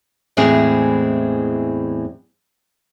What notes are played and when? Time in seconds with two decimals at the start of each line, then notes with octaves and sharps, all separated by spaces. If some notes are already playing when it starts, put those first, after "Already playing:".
0.37 E2 A2 E3 G#3 C4 G#4